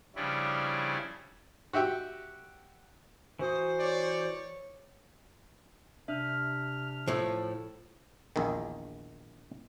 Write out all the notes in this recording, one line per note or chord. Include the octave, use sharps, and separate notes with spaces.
C#3 F3 G3 C#4 D4 E4
F#4 G4 E5 G5
E3 F#4 C5 D#6
C#5 D5
C3 D4 E5 F6
A2 F3 A5 E6
A#1 E2 D#3